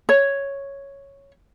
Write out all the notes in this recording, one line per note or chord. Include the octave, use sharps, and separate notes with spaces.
C#5